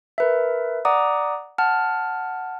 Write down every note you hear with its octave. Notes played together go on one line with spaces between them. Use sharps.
A#4 B4 E5
D5 F#5 A#5 D6 D#6
F#5 A5 F6